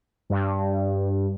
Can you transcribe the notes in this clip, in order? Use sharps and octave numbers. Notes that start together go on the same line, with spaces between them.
G2